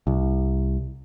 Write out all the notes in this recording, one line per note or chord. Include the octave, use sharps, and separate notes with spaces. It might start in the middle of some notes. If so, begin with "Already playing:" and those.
C2